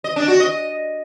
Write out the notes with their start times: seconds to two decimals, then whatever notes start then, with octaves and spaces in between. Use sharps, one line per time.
0.04 D#5
0.16 D4
0.28 F#4
0.40 D#5